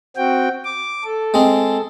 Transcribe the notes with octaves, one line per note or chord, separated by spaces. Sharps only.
C4 F#4 G5
D6
A4
G#3 C4